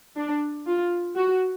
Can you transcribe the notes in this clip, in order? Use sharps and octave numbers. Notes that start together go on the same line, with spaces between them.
D4
F4
F#4